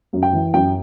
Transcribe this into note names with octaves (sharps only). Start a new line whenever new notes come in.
F#2
G5
E3
F#2 G5